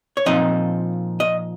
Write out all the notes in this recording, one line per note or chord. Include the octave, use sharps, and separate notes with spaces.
C#5
A#2 F3 C4 D#4 D#5
D#5